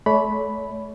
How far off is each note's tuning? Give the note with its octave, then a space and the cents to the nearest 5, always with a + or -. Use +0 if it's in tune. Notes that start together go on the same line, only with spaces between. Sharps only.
A3 -40 C#5 +40 B5 +0